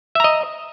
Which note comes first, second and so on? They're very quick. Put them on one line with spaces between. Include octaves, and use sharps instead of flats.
E5 A#5 D#5